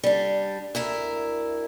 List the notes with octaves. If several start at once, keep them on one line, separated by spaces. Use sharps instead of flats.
G3 D4
D2 E4 A#4